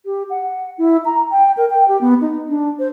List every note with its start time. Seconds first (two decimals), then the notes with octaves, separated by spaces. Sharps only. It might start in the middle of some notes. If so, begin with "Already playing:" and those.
0.06 G4
0.30 F#5
0.78 E4
1.05 A#5
1.31 G5
1.57 A#4
1.70 G5
1.88 G4
2.01 B3
2.21 D#4
2.48 D4
2.79 C5